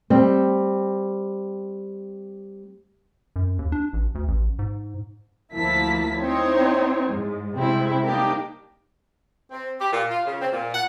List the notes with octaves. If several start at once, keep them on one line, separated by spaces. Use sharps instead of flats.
G3 C4
F#2
D#2
D4
A1
D2
A1
G#2
D2 F3 A#3 E4 A5 B6
C4 D#4 E4 C5 C#5
G#2 G#3
C3 G3 G#3 C4 E4
A#3 D4 D#4 G4 A#4
C4
G4
A#2
F4
C#3
C4
A#2
F#5